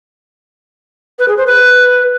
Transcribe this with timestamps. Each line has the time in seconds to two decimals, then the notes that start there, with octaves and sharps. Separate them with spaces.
1.19 B4
1.28 G#4
1.37 C5
1.47 B4